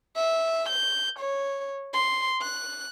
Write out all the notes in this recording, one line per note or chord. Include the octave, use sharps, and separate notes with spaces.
E5
G6
C#5
C6
F#6